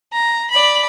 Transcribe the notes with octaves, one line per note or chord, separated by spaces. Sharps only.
A#5
D5 B5